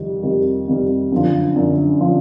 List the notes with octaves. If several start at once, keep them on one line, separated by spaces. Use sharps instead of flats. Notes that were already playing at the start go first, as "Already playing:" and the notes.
Already playing: F2 C3 D#3 G3
F2 C3 D#3 G3
F2 C3 D#3 G3
F#2 D3 F3
F#2 D3 F3
D3 F3